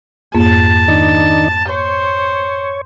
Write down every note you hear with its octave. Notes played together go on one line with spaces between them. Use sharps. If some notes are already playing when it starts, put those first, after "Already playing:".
F2 G#2 A#3 A5
D#3 D4 D#4
C5 C#5